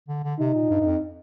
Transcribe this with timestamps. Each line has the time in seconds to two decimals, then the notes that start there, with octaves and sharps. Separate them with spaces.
0.08 D3
0.24 D3
0.39 C3 D#4
0.55 A#2
0.70 G2
0.80 G2
0.86 F2